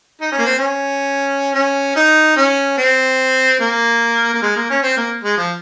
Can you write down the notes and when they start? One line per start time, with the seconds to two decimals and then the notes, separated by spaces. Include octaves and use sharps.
0.21 D#4
0.32 C#4
0.38 A#3
0.45 C4
0.59 C#4
1.54 C#4
1.96 D#4
2.36 C#4
2.78 C4
3.60 A#3
4.34 A#3
4.42 G#3
4.56 A#3
4.70 C#4
4.83 C4
4.97 A#3
5.24 G#3
5.37 F3